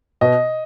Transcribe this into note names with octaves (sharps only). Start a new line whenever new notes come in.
B2 D#5